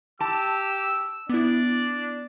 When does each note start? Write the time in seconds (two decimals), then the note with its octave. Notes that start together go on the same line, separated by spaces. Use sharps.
0.20 G4 A5 E6
1.29 B3 D4 E4 D5